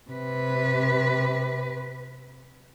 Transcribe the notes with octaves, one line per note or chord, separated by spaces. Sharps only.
C3 B4